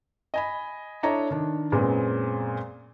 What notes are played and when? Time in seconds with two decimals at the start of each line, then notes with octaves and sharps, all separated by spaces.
0.34 D#5 G#5 B5
1.03 D4 E4 A4 C#5 D#5 A#5
1.31 D#3 D4
1.72 F#2 A#2 G#3 B3 C4